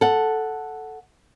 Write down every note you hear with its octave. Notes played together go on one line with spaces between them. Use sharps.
A4 F#5